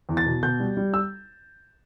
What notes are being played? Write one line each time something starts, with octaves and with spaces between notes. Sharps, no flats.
E2
A6
B2
B2 G6
G3
G3
E6